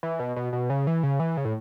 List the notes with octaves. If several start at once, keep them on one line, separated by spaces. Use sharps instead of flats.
E3
B2
B2
B2
C#3
E3
C#3
E3
C#3
A2